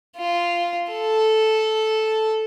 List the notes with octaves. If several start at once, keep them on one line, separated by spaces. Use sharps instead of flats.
F4
A4